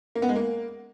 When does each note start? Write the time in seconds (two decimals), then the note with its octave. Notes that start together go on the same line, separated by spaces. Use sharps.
0.16 A#3
0.22 B3
0.29 G#3
0.36 A#3